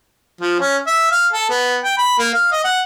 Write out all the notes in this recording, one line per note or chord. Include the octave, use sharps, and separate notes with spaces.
F3
C#4
E5
F5
A4
B3
G5
B5
A#3
F5
D#5
F#5